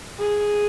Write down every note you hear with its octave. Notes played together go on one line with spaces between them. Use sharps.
G#4